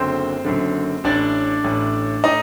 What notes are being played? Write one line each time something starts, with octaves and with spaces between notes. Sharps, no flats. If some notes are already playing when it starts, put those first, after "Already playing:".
Already playing: F#1 F#2 D3 C4 C5
F#1 F#2 D3
A1 A2 D4 D5
A1 A2
A2 D#4 D#5